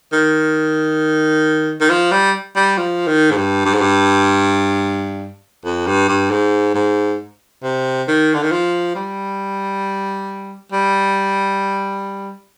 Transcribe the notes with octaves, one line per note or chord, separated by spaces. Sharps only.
D#3
D#3
F3
G3
G3
F3
D#3
G#2
G2
G2
G#2
G2
F2
G2
G2
G#2
G#2
C3
D#3
D3
D#3
F3
G3
G3